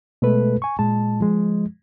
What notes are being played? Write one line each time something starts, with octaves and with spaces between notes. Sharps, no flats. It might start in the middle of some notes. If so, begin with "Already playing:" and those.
B2 G#3 A3 A4 B4
G#5 C#6
A#2 G#3 A5
F3 G#3